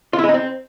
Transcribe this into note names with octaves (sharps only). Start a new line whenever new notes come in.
F4
E4
G#3
D#4
C4